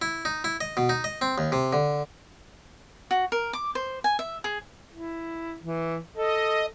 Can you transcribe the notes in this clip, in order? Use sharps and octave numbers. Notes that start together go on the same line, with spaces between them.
E4
D#4
E4
D#5
B2
D#4
D#5
C4
D#2
C3
D3
F#4
A#4
D6
C5
G#5
E5
G#4
E4
E3
A4 D#5